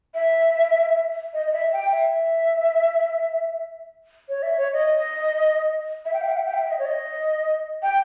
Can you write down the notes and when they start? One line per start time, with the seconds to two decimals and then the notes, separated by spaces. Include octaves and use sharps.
0.15 E5
1.34 D#5
1.47 D#5
1.53 E5
1.73 G5
1.92 E5
4.29 C#5
4.43 E5
4.58 C#5
4.73 D#5
6.05 E5
6.13 G5
6.22 E5
6.29 G5
6.37 E5
6.46 G5
6.54 E5
6.64 E5
6.71 D#5
6.79 C#5
6.86 D#5
7.83 G5